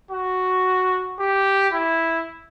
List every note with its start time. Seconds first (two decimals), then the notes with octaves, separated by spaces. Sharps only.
0.11 F#4
1.20 G4
1.73 E4